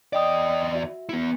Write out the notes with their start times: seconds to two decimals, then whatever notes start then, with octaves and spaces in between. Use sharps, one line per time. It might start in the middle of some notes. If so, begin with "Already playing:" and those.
0.13 E2 D5 D#5 G5 D#6
0.75 F#4 E5
1.09 B3 E4 C#7